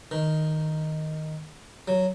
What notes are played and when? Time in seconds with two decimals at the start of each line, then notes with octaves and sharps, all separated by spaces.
0.11 D#3
1.88 F#3